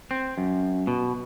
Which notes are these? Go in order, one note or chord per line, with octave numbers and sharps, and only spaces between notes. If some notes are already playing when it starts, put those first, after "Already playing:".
C4
F#2
B2